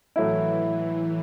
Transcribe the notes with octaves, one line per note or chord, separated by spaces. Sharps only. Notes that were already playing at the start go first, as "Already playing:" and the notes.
A2 E3 F#3 A3 E4